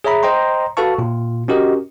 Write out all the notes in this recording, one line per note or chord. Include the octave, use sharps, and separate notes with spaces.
G#4 C#5 E5 A#5 B5
C5 D#5 G5 A#5 C6
F#4 A4 B4 F5 A5 C#6
A#2 F4
C#4 F#4 G4 A#4 D#5